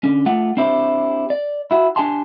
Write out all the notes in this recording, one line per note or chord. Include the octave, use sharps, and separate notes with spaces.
D3 C#4
A3 F4 F#5
C4 D4 E4 G4 C5
D5
E4 F#4
D4 G4 G#5 A5 C6